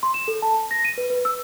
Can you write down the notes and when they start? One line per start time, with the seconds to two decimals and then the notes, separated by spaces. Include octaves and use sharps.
0.03 C6
0.14 E7
0.28 A4
0.42 A5
0.54 A5
0.71 A#6
0.85 D#7
0.97 B4
1.10 B4
1.25 E6